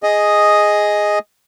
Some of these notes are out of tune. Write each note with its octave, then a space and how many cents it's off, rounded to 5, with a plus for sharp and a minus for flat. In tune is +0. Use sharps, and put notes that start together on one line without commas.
G#4 +0 D#5 +0